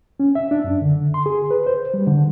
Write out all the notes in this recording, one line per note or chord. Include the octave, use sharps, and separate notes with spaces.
C#4
E5
D4
F#2
D3
C6
G#4
B4
C5
G3
D3